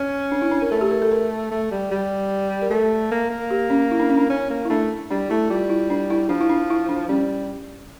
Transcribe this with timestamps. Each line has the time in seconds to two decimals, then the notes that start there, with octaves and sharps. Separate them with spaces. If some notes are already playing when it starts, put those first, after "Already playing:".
Already playing: C#4
0.32 D4
0.42 E4
0.52 D4
0.62 A#4
0.71 A3 A4
0.81 G4
0.91 A#4
1.02 A4
1.12 A#4
1.51 A3
1.71 G3
1.91 G3
2.62 A#4
2.70 A3 A4
3.11 A#3
3.30 A#3
3.51 G4
3.70 C#4
3.91 E4
4.00 D4
4.09 C#4
4.17 D4
4.30 C#4
4.50 A#3
4.65 E4
4.70 A3 D4
5.11 G3 D4
5.30 A3 E4
5.50 G3 F4
5.69 E4
5.90 D4
6.10 E4
6.29 F3 D4
6.41 E4
6.50 D4
6.70 E4
6.89 D4
7.09 G3 C#4